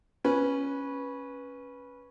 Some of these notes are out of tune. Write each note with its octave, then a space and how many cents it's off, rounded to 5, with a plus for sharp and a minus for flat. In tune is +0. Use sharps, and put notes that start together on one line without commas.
C#4 +0 B4 -10